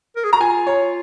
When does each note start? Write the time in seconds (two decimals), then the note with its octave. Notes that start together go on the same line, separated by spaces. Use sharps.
0.16 A#4
0.24 G#4
0.32 F#4 A#5
0.40 F4 G#5
0.67 C#5